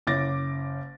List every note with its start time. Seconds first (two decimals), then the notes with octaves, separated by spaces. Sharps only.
0.07 F#1 C#4 E4 D6 A6 A#6